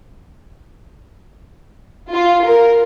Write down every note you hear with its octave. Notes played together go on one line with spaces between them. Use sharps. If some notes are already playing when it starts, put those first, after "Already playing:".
F4
A#4